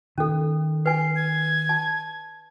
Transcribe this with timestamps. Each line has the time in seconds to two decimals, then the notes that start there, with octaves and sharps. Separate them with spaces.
0.18 D#3 C#4 A4
0.86 B4 G#5 C7
1.16 G#6
1.69 A5